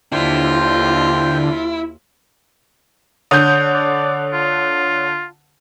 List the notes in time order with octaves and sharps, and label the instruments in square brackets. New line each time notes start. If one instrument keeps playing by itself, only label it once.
[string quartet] D#2 F4 [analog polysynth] D3 [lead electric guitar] E4 [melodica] C5 G5
[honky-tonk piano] D3 G6 [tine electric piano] C#5 D#6
[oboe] D5
F4